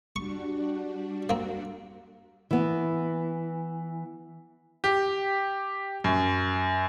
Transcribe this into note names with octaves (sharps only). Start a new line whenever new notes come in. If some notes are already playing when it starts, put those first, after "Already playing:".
G3 D4 F#4 C#6
A#3 C4
E3 B3
G4
F#2